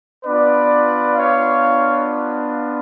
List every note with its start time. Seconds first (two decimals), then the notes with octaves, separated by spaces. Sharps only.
0.25 B3 D4 F4 B4 D5
1.15 C#5 F5